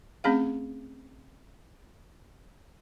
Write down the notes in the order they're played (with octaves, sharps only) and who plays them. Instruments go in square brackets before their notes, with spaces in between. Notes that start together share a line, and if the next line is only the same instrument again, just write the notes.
[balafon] A3 C4 C#4 G#4 F5